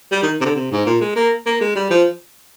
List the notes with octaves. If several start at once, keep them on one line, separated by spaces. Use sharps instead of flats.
G3
D#3
C3
D3
C3
G#2
A#2
G#3
A#3
A#3
G#3
G3
F3